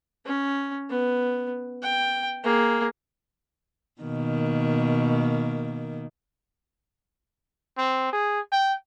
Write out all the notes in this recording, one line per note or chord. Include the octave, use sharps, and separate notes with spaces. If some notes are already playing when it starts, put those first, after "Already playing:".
C#4
B3
G5
A#3 G#4
B2 D#3 A#3
C4
G#4
G5